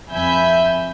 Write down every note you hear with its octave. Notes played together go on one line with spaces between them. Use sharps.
F2 E5 G#5 B5 G6